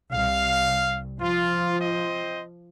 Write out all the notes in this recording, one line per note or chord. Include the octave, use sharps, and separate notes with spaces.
C2 F5
F3 F4
C4 C5 D#5